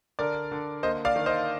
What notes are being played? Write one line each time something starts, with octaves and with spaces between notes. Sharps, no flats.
D3 A#4 D5
D3
A#3 C5 D#5
D5 F5
D#3
C5 D#5